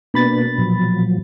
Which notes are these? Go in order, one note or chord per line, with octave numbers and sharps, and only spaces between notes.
B2 A#3 D4 B4 B5 A6
A#2 F3 F#3